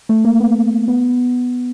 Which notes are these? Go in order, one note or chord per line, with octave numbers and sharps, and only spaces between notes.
A3
A#3
B3
B3